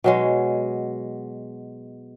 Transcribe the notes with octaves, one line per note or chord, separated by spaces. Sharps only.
B2 F#3 G#3